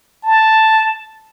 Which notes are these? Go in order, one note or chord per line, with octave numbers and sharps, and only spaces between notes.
A5